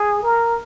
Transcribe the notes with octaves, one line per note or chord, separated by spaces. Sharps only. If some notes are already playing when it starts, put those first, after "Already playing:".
Already playing: G#4
A#4